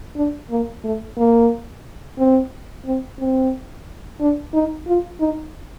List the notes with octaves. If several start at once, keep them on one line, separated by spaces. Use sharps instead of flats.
D4
A#3
A3
A#3
C4
C4
C4
D4
D#4
F4
D#4